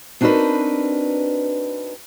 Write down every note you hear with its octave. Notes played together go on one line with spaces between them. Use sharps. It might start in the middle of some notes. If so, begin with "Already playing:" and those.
C4 D4 D#4 F#4 A#4 B4